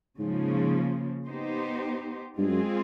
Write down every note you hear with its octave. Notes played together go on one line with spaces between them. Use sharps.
G#2 C#3 F3 A#3
B3 D#4 G4 C5
G2 G#3 C4 F4 G#4
F#2